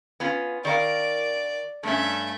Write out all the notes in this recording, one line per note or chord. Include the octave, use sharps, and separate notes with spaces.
B3 C#4 F4
D#3 A#4 D5 F5
G2 A3 C#4 E5